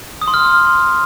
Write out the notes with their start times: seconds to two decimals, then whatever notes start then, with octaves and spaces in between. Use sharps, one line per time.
0.22 D#6
0.28 C6
0.34 F6